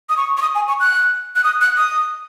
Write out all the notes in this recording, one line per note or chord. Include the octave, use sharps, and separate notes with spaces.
D#6
C#6
C#6
D#6
G#5
C#6
F#6
F#6
D#6
F#6
D#6